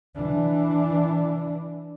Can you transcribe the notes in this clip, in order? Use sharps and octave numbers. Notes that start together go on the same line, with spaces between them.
E3 D4